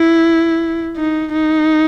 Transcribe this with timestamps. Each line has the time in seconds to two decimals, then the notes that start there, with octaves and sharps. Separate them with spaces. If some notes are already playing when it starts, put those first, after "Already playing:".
Already playing: E4
0.97 D#4
1.32 D#4